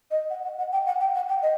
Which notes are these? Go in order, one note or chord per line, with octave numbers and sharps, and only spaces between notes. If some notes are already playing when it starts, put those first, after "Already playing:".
D#5
F#5
F#5
F#5
G5
F#5
G5
F#5
G5
D#5